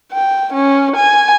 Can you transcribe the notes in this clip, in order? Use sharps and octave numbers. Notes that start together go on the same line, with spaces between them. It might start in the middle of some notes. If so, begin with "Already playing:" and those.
G5
C#4
G#5